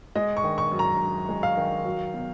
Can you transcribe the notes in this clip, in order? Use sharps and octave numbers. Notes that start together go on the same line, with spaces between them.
G#3 D#5
C#6
D#3
C#6
F#2
A#5
F#2
G#3
F5
D#3
F#3
B2